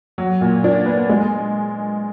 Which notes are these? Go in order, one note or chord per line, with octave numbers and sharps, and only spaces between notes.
F#3
A#2
D4
B3
G#3